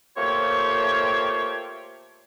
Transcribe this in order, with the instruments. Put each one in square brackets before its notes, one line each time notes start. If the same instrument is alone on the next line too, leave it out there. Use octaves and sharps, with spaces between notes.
[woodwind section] A3 A#3 F4 G4 C5 C#5